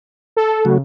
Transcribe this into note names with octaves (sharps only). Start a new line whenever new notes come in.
A4
C#3 F#3 A3 F#4